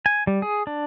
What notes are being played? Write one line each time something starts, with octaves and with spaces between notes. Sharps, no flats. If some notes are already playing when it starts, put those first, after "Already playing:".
G#5
G3
G#4
D4